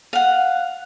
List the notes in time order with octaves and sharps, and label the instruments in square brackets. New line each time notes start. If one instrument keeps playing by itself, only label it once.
[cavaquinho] F5 F#5